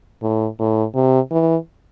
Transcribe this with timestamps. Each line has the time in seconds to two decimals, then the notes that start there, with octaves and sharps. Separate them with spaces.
0.22 A2
0.59 A2
0.95 C3
1.31 E3